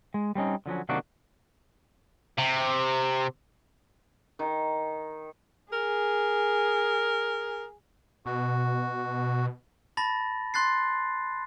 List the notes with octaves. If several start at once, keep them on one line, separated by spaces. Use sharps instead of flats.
G#3
G3 C4 C#4 D#4
D3 F3 F#3 C#4
C3 D#3 F#3 A#3 D4 F#4
C3
D#3
G#4 A#4
B2 F#4
A5 B5 A6 A#6
C6 F#6 A6 C7